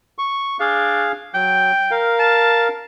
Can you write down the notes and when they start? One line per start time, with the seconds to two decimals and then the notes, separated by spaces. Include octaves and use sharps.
0.18 C#6
0.60 D4 G#4 F5
1.35 F#3 G5
1.91 A#4 F5
2.19 A5